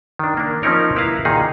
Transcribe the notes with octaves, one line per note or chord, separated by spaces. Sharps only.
D#3 D4
A#3 D4
F3 C4 C#4 D#4 A#4 C#5
A#3 E4 B4 F5 A#5
A#2 D#3 D#4 G#4